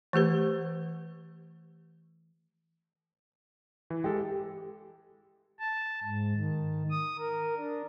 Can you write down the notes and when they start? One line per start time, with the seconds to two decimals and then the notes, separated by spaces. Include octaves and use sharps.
0.13 E3 A3 G4 B4
3.90 E3
4.04 G#3 G4 A4
5.59 A5
6.03 G#2
6.36 D#3
6.91 D#6
7.19 A#4
7.57 D4